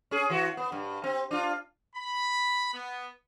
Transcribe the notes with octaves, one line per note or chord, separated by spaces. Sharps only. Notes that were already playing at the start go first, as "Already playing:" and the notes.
C#4 G#4
E3 F#4
B3
G2
C4
D4 F4
B5
B3